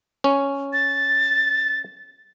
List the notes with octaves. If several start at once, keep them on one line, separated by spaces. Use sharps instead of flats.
C#4
A6